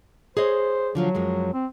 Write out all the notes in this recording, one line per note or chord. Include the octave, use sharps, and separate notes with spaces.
G#4 C5 C#5 D#5
D3 F3 F#3 F4
F#2 F3 G#3
C4